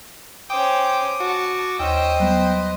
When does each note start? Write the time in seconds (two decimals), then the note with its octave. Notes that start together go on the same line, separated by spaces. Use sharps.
0.50 C#4 C5 G5 D6 D#6
1.20 F#4 A5
1.79 D#2 C#4 C5 D#5 G5 E6
2.20 F#3 G3 B3 B4